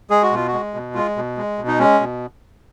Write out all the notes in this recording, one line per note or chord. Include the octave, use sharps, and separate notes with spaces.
G#3 G#4
F#4
B2 F4
F#4
G#3
B2
G#3 F4
B2
G#3
B2
D#4
G#3 C#4
B2